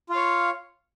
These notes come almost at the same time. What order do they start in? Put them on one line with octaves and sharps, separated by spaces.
F4 F5 C#5